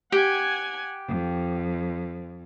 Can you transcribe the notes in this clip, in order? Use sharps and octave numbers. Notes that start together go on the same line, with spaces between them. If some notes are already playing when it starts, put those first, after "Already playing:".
G4 F#5 G#5 G#6
F2